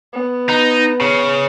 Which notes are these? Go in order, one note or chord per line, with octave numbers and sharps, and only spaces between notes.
B3
D#4
C#3